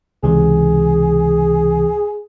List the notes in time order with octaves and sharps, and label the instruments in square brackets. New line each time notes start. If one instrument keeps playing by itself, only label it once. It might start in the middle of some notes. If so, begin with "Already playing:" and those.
[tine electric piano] C#2 C3 E3 [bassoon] G#4